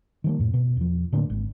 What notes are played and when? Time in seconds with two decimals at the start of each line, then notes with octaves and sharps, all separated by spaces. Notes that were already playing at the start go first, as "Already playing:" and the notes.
0.24 D#3 G3 A#3
0.39 F2 A2
0.54 B2
0.77 E2 F3
1.12 A2 D3 A#3 D4
1.30 G#1